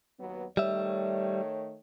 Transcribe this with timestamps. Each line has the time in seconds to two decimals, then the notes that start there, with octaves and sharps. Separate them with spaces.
0.20 D#2 F#3 B3
0.57 D#3 G3 A3 C#5 E5